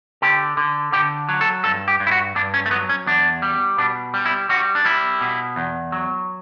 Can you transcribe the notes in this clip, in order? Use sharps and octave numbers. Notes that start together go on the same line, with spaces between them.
D3 G4
D3
D3 G4
F#3
A4
G2 A4
G4
G2
E4
F#4
G2 D4
C#4
A3
F#3 B3
C#4
E2 D4
G3
B2 D4
G3
E4
G3 F#4
D4
G3 E4
B2
E2
F#3